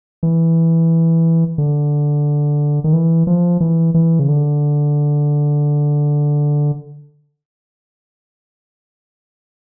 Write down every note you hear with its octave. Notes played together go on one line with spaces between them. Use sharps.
E3
D3
D#3
E3
F3
E3
E3
C#3
D3